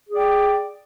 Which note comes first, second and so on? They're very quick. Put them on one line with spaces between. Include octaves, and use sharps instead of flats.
G#4 D5 G5